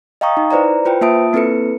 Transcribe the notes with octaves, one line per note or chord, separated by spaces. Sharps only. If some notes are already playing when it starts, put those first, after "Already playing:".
D#5 F5 G5 A#5 C#6 D#6
D#4
E4 B4 C5 D5 A#5
F4 B4 C5 G5
A#3 F4 E5 A5 D#6 D7
A#3 C4 E4 A4 B4 C#7